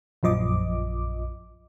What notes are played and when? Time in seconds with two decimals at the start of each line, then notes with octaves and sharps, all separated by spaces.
0.23 A#1 F#2 F3 D#5 D6